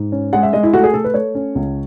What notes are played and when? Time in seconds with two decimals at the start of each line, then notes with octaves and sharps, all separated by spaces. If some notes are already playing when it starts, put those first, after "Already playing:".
Already playing: G#2
0.12 C#4
0.33 G#3 F#5
0.43 E5
0.53 G#3 D#5
0.63 E4
0.73 A3 F#4
0.83 G#4
0.94 A3 A4
1.04 B4
1.14 A3 C#5
1.35 C#4
1.55 C#2